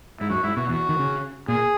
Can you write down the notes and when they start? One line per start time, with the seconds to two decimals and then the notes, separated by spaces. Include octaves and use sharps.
0.20 G#2 E4
0.30 F#2 F#4
0.43 G#2 E4
0.57 B2 F#4
0.69 E2 F#4
0.89 D#3
0.99 C#3
1.48 A#2 G#4